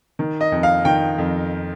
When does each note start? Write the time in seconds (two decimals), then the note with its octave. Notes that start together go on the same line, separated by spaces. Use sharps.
0.19 D#3
0.41 D#5
0.52 F2
0.63 F5
0.85 D#3 G5
1.18 F2